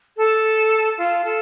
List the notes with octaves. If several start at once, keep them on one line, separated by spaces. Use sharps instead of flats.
A4
F4
A4